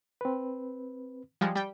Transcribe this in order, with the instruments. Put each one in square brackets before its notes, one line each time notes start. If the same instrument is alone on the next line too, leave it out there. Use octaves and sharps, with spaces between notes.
[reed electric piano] C4 B4
[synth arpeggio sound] F3 G3 G#3
G3 G5